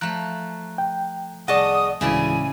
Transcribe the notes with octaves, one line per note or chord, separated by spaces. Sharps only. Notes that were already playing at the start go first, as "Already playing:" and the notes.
F3 A3 A#5 F#6
G5
C2 G#4 D5 D#5 F#5 A5 C#6 D#6
D2 A2 C#3 E3 G#3 E4 D5 G#5